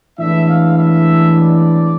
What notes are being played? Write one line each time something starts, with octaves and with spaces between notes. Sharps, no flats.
A2 E3 G#3 B3 D4 E5
F5
E5
D5